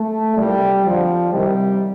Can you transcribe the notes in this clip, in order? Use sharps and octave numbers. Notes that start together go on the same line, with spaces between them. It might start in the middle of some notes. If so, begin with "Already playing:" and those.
Already playing: A3
C2 A#2 G3
F2 D3 F3
C2 C3 D#3 G3